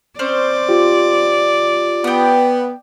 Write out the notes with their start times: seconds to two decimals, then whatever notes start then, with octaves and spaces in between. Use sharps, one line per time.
0.19 C4 C#4 C5 D5
0.69 F4 G4
2.04 B3 G5 D#6